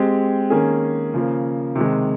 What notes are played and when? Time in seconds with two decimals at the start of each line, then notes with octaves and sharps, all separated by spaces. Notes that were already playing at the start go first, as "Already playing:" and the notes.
Already playing: G#3 C4 G4
0.50 D#3 A#3 C#4 G#4
1.14 C#3 F3 A#3
1.75 C3 D#3 G#3